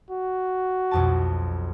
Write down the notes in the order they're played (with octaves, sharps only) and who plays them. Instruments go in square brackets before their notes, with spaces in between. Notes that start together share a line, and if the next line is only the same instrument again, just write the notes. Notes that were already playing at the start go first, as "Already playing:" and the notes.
[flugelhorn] F#4
[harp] B1 F2 A5